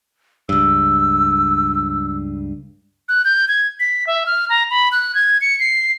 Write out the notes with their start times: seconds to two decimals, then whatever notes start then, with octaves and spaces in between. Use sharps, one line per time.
0.49 C#2 G2 E6
3.09 F#6
3.25 G6
3.48 G#6
3.80 B6
4.07 E5
4.26 F6
4.49 A#5
4.70 B5
4.92 F#6
5.15 G#6
5.41 C#7
5.60 C7